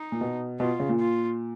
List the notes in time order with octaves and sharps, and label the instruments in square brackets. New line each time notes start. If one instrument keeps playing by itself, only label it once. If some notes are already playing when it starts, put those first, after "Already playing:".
Already playing: [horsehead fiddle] D#4
[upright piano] A#2
B2
[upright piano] B2 [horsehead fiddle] F4
[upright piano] C#3
A#2
[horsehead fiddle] F4